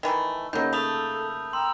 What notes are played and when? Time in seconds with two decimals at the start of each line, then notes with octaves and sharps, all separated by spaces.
0.03 D#3 E3 A3
0.53 C#3 E3 F#3 A#3 D#4 C#5 D#5 G6
0.73 A3 A4 B5 D#6 F7
1.53 G5 A#5 C6 E6